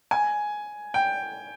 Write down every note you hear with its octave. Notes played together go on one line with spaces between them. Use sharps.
G#5
G5